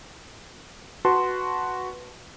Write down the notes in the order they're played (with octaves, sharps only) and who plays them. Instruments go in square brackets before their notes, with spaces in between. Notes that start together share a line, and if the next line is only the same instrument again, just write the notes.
[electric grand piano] F#4 B4 A5 C6